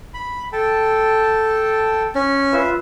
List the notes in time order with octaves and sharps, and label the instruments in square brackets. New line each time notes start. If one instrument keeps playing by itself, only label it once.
[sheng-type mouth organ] B5
A4 G5 A5
[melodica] C#4
[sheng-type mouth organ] F4 B4 E5